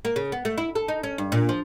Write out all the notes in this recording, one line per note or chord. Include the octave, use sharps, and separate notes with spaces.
A#3
C#3
B3
A3
E4
A4
D#4
C#4
G2
A#2
F3